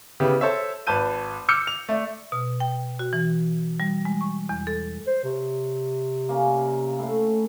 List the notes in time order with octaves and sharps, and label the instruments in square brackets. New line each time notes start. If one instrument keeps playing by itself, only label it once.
[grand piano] C#3 B3 E4 G4
A4 C5 C#5 E5
G#1 B4 A5 G6 D#7
D6 E6 F6 G6 C#7
F7
A3 D5
[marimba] B2
G5
F#4
E3
G3
G#3
C#6
E2
A4
[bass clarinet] C5
[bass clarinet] C3 [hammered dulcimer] C#5
[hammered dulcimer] A#3 C#4 D5
A2 A3